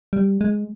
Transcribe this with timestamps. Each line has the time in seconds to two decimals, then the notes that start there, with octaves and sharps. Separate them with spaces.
0.13 G3
0.41 G#3